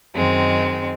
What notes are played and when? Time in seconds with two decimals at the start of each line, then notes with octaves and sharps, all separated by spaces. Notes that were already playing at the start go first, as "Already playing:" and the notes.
0.14 F#2 D#3 G#3 C4